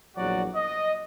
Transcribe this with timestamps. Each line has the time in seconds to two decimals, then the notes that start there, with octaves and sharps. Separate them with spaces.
0.16 A#1 E2 F#3 F#4 D5 F#5
0.55 D#5